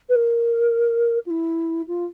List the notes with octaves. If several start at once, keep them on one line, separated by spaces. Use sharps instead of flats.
B4
A#4
F4
E4
F4